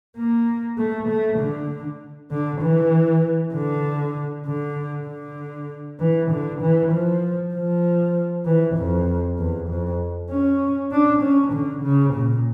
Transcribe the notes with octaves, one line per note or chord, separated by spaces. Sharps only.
A#3
A3
A3
D3
D3
E3
D3
D3
D3
E3
D3
E3
F3
F3
E3
F2
E2
F2
C#4
D4
C#4
D3
C#3
A#2